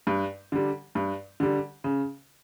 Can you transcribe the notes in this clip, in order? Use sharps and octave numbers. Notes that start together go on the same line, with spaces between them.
G2
D3 G3
G2
D3 G3
C#3